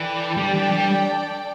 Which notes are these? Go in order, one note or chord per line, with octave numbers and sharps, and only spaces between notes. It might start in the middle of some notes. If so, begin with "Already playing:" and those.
Already playing: E3 D4 A4 D5 G5
G3
E3
G3